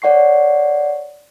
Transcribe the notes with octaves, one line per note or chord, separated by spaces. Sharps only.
C#5 D5 F#5 C#6 C7